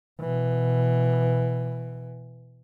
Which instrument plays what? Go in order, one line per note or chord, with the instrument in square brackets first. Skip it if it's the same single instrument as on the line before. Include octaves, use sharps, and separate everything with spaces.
[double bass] B2 E3